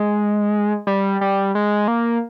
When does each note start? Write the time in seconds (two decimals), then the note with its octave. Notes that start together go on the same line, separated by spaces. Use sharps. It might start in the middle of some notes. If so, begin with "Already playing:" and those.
Already playing: G#3
0.87 G3
1.21 G3
1.55 G#3
1.88 A#3